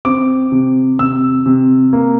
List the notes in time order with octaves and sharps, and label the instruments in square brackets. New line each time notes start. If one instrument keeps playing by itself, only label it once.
[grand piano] C4 D6
C3
C3 E6
C3
A#3